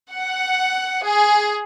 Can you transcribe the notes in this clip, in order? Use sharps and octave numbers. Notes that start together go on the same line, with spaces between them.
F#5
G#4